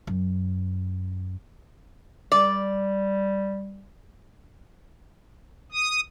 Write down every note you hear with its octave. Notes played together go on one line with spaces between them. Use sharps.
F#2
G3 D5
D#6